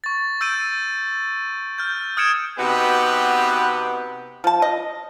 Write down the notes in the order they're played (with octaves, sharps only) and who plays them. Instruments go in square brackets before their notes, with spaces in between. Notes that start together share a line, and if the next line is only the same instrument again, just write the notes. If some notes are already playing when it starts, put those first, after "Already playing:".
[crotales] C#6 A6
E6 G6 A6 D7 D#7
F6 G6
D#6 F6 G#6 C#7 D7 E7
[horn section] C3 B3 D#4 F#4 G4 B4
[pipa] F3 A5
D#5